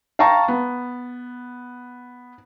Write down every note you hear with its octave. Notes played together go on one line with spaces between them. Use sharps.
F5 G5 A5 A#5 C#6
B3